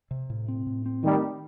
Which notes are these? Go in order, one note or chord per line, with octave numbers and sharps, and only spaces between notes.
C3
A2
C4
A2
C4
D#3 G3 A3